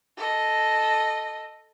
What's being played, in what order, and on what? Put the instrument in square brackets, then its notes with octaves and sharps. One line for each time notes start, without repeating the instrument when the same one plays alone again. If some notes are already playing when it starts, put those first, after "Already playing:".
[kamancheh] A4 D#5